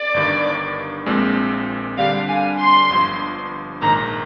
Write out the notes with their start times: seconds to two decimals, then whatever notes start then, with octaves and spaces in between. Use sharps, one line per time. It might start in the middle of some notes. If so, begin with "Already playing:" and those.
Already playing: D5
0.14 G1 G2 D#3
1.06 A#1 A#2 G#3 C4
1.98 D3 G3 D4 G4 F5
2.29 G#5
2.59 C6
2.90 G1 G2 F3
3.82 A#1 G#2 D#3 A#5